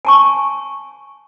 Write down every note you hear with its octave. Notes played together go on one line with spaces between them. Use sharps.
G#5 A5 C#6